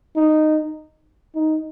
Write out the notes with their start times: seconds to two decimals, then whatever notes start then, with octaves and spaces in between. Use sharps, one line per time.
0.16 D#4
1.35 D#4